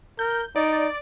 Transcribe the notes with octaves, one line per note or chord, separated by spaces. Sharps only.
A#4 G6
D#4 D5